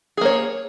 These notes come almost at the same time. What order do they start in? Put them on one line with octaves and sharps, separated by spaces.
G#4 A#3 C#5